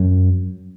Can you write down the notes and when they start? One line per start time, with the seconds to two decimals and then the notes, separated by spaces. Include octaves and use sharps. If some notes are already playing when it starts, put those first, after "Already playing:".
Already playing: F#2